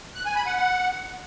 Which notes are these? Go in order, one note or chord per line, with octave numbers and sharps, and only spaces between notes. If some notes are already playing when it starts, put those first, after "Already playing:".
F#6
G#5
B5
F#5
F#5